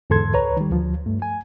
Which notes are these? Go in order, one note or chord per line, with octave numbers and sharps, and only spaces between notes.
E2 G#2 D3 A4 C6 G#6
C#2 B4 C#5 A#5
D#3 G3
D2 F3
G2 A3
G#5